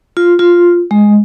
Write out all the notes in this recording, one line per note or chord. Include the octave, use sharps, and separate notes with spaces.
F4
F4
G#3